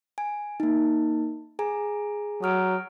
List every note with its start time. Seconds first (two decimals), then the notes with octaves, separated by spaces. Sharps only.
0.18 G#5
0.60 A#3 D#4
1.59 G#4 G#5 A#5
2.43 F#3 D#6 F6 D7